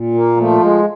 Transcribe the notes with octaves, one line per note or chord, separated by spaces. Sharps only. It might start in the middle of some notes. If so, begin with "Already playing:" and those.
Already playing: A#2
A#3
F3 A3
G#3